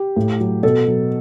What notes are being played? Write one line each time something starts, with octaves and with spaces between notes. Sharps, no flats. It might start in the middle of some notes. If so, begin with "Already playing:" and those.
Already playing: G4
A2
F#3
B2 A4
F#3